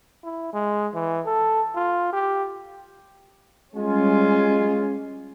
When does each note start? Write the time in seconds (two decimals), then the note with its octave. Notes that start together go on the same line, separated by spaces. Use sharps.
0.24 E4
0.53 G#3
0.95 E3
1.26 A4
1.76 F4
2.13 G4
3.76 G3 G#3 C#4 F4 G#5